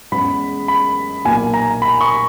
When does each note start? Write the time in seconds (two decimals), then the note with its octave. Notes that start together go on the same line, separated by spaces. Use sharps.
0.12 E2 C#3 G#3 B3 B5
0.68 B5
1.25 B1 A#2 A#3 G#5
1.54 A#5
1.82 B5
2.01 C#6